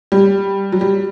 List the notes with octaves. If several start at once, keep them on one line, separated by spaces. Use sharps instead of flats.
G3
F#3
G3